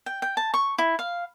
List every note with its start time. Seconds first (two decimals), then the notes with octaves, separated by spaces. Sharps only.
0.06 G5
0.22 G5
0.37 A5
0.54 C#6
0.78 E4
0.99 F5